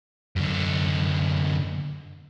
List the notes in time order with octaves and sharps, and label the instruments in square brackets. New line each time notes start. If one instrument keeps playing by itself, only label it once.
[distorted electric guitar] F#2 D3